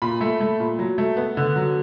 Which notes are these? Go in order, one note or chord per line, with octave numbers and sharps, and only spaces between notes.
A#2 B5
A3
A3
A#2
F#3
A3
B3
D3
F#3